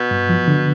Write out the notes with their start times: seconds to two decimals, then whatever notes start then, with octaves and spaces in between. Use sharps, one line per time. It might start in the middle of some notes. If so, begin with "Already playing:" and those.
Already playing: B2
0.11 G2
0.29 F3
0.48 D3